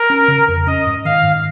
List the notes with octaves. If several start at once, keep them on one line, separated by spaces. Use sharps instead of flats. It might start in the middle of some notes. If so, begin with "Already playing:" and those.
Already playing: A#4
C#4
C#3
F2
C#4 D#5
G#2
D#3 F5
G#2